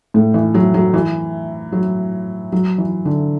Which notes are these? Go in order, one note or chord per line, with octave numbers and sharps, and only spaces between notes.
A2
E3
F#3
F#3
E3
F#3
F#3
E3
D3